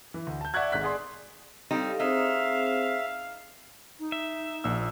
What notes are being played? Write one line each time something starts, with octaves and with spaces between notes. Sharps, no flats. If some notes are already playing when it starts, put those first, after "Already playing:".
E3
D2
A5 G6
D5 E5 F#5 C#6 F#6 G#6
G#1 G#2 F#6 B6
G#4 D5 C6
G3 C4 D#4 G4 A4 F5
C4 D#4 G#4 C5 E5 F5
D#4
E5
A#1 A#2 E6